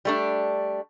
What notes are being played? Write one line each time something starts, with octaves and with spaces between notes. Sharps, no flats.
G3 A3 D4